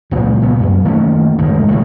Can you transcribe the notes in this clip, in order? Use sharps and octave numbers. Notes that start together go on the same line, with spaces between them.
C#2 A#2 C#3 F3
A#2 C#3 B3
F#2
D#3 A3 A#3 C#4
D1 C#2 F#2 D#3
A#1 A2 D3 D#3